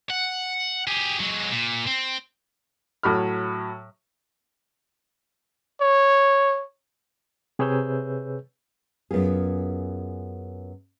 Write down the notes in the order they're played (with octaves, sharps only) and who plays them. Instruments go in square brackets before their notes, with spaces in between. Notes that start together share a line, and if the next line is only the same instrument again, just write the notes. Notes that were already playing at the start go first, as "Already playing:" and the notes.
[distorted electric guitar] F#5
G4 G#4
F#3 G#3
A#2
C4
[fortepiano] A2 F#3 B5 F6
[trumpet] C#5
[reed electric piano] C3 G#4 B4 C#5 E6 G6
[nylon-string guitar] F#2 B3 F4 G#4